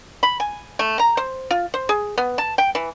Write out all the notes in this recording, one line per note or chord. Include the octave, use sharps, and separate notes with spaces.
B5
G#5
A3
A#5
C5
F4
C5
G#4
B3
A5
G5
E3